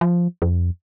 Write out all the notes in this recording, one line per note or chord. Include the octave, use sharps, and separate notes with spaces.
F3
F2